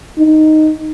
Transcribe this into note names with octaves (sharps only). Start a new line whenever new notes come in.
D#4